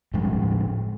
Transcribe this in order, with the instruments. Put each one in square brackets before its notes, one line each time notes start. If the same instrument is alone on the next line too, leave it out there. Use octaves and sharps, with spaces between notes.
[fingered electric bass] A2 F3 G3 G#3